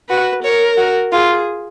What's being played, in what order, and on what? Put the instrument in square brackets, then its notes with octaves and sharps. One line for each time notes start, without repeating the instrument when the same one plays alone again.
[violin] F#4 [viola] B4
[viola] A#4 [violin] C#5
[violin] F#4
[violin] F4 [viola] G#4